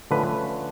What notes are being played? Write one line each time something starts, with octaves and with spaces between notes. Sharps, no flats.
D3 F3 A3 C#4 B4